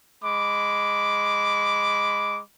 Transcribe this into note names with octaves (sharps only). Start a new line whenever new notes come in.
G#3 B5 D6